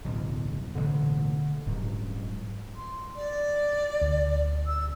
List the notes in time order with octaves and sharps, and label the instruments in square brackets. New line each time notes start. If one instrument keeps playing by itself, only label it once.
[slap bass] D1 B1 E2
[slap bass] A1 B2 [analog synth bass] D3
[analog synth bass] D#1 [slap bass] G#2 F#3
[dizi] C6
D5
[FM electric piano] D2
[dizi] E6